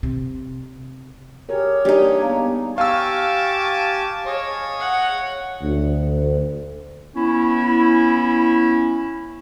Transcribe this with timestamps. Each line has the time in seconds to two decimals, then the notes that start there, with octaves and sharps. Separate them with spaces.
0.03 C3
1.49 G4 G#4 A#4 C#5
1.85 G3 A#3 D4 D#4 G#4
2.22 B3 F5 A#5
2.78 G4 F5 G#5 A5 C#6 D6 E6
4.27 G#4 C#5 D#5
4.80 F#5
5.62 D2
7.15 B3 C#4 E4